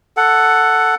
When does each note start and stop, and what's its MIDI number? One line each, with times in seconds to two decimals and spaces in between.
0.17 0.95 69
0.17 0.95 78